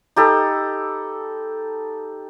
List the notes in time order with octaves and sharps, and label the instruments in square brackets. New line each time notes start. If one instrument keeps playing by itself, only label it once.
[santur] D#4 G4 A4 B5